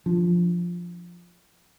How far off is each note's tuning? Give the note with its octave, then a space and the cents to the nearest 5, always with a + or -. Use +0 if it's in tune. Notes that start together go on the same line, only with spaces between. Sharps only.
F3 +0 D4 +0